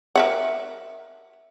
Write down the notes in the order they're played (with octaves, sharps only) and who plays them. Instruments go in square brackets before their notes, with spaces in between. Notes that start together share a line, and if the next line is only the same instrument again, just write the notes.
[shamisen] A#4 E5 F#5